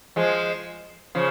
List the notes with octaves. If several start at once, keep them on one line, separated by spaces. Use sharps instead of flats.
F3 G#3
C#3 F3